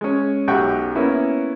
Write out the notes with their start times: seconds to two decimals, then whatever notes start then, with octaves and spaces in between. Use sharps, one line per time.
0.01 G#3 C#4
0.48 B1 F#2 G4 F#5 G5 C#6
0.95 A#3 B3 C#4 E4